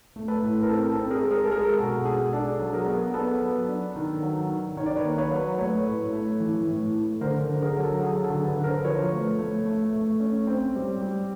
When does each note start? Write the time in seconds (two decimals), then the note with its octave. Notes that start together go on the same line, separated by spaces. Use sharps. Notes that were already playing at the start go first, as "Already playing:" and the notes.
0.16 A3
0.28 A4 B4
0.42 A2
0.63 A#4
0.69 C4 A4
0.90 A4
0.96 C4
1.10 G#4 A#4
1.24 G#3
1.31 G#4 A#4
1.45 A4
1.50 G#3 G#4 A#4
1.79 B2 A4
2.05 G#3 G#4
2.33 D4 A4
2.59 F#3
2.73 G#4 A#4
2.86 B3
3.14 B3 A4 B4
3.42 F#3
3.68 D4
3.96 D#3
4.22 F#3
4.49 D#3
4.77 D#3 C#5
4.86 D5
4.97 B4 C#5
5.05 A#3
5.18 B4 C#5
5.31 F#3
5.58 A3 B4 C#5
5.86 A2
6.13 A3
6.40 E3
6.67 A2
6.94 A3
7.21 D3 A#4 C5
7.49 D3
7.62 G#4 A#4
7.76 F#3
7.83 A4
8.03 F#3 G#4
8.24 A4
8.30 D3
8.44 A4 B4
8.57 D3
8.64 A#4 C5
8.85 F3 B4 C#5
9.12 A3
9.39 A3
9.65 A3
9.93 A3
10.20 C#4
10.47 C4
10.75 G3
11.01 G3